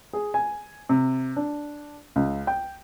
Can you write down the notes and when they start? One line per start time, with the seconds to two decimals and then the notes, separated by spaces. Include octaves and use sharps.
0.13 G#4
0.34 G#5
0.89 C3
1.36 D4
2.16 C#2
2.47 G5